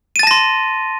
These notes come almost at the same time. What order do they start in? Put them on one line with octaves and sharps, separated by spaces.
D#7 A6 A5 A#6 C6